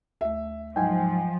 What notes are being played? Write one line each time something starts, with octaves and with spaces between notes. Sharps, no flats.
D2 A3 E5
G#2 F3 F#3 G5 G#5